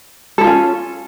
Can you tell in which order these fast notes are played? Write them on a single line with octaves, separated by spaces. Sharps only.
A4 E4 F4 C#4